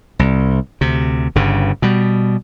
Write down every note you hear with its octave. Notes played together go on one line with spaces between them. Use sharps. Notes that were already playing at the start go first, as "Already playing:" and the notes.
C2
D2 C3
G1 G2 C#3
B2 G3